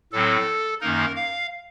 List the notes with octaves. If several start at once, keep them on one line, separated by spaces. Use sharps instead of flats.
A2 F#3 C4 A4
F#2 D#3 A#3 D#4 A#4
F5